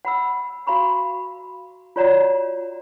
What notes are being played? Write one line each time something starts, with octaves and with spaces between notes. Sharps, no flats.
F#5 B5 E6
F#4 F5 A#5 B5 C#6
F4 F#4 C#5 D5 F#5 A#5